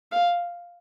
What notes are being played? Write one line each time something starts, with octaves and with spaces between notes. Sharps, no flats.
F5